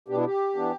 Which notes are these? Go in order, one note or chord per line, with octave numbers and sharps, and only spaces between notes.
B2 B3 D4 G4
E4
G4
E3 B3 D4